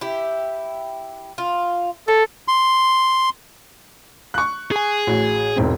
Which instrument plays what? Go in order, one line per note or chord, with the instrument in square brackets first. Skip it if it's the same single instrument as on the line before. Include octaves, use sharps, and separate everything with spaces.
[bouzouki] E4 G4
F4
[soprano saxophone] A4 [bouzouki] C#5
[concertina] C6
[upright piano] C#6 F#6
[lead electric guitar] G#4 G#5
[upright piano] A1 F#4
E1 G#2 C4